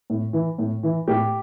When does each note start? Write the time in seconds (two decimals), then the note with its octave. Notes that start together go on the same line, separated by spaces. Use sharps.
0.10 A2
0.33 E3
0.58 A2
0.83 E3
1.08 A2 G4